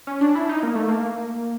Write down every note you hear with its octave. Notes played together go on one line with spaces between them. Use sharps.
C#4
D4
E4
D#4
A#3
A3
A#3